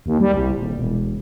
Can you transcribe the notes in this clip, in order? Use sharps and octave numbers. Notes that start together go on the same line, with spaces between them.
D#2
G3
C2
D#1
E1